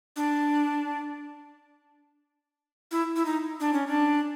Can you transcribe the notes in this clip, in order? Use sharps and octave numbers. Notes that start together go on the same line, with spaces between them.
D4
E4
E4
D#4
D4
C#4
D4